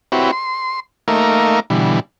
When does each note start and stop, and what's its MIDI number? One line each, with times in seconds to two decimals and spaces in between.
0.12 0.31 60
0.12 0.31 64
0.12 0.31 66
0.12 0.31 67
0.12 0.31 71
0.12 0.31 73
0.32 0.80 84
1.08 1.60 57
1.08 1.60 58
1.08 1.60 63
1.08 1.60 70
1.08 1.60 76
1.08 1.60 77
1.70 2.00 47
1.70 2.00 50
1.70 2.00 52
1.70 2.00 55